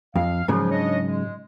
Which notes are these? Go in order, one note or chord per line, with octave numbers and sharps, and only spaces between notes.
F2 F5
G#2 C#3 F3 F#3
D4 C#5 D#5
G#3